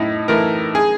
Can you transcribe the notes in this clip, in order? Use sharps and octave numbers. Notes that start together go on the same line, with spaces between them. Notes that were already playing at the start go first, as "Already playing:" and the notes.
Already playing: A2 D#4 E4
E3 A3 A#4
G#4